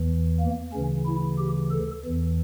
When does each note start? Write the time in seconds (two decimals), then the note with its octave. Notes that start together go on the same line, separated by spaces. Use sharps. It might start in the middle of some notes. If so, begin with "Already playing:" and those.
Already playing: E2 E3
0.40 A#3
0.73 D2 C#3 E3 C#4
1.06 E4
1.39 G4
1.71 A4
2.05 E2 E3